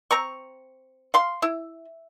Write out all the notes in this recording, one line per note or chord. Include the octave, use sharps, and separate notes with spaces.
C4 A#5 C#6
F5 C6
E4